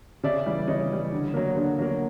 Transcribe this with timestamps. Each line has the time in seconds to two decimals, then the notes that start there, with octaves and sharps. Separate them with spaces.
0.23 C#3 D5 E5
0.46 E3 G3
0.68 C#3 C#5 D#5
0.90 E3 G3
1.12 D3
1.34 F#3 A#3
1.56 D3
1.79 F#3 A#3